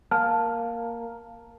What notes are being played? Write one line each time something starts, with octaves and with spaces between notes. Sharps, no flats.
A#3 A5 F6